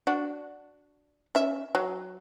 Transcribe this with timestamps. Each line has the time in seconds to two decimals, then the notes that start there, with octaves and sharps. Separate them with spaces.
0.07 D4 F#4
1.35 C#4 E5
1.75 F#3